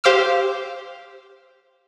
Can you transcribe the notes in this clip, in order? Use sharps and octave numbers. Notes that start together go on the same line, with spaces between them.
G4 C5 F5 D6 E6 F6